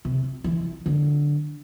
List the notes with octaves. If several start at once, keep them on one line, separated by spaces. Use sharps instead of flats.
C3
E3
D3